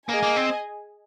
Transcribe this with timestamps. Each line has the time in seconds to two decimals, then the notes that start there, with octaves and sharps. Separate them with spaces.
0.09 A#3 G#4 D#5 G#5
0.23 A#3
0.36 C4